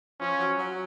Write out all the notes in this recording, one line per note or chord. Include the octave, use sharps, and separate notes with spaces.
F3 C#4
F#3
F#3